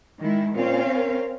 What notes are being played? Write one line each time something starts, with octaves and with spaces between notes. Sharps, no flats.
D#3 G#3 E4
A#2 C4 C#4 F5
A#4